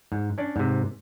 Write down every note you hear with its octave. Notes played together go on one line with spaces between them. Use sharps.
G#2
C#4 D4
G#2 C3